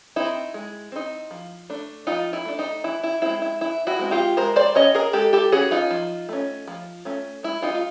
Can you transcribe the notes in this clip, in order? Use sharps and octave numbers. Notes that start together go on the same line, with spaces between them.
C4 D#4 E4
G#3
C4 D#4
F3
A3 D4
F3 D#4 F4
E4
A3 D4
D#4
E3 E4
E4
G#3 C4 E4
E4
E3 E4
E4 F#4
G#3 C4
F4 G4
G#3 A#4 C5
C5 D5
C#4 C#5 D#5
G#4 A#4
G#3 G4 A4
G4 A4
C#4 F#4 G#4
D#4 F4
F3
A3 C#4
F3
A3 C#4
G#3 E4
D#4 F4
F4